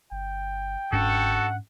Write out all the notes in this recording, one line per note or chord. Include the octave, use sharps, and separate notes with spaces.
G1 G5
G1 G#2 C#4 D4 F#4 A4
F#5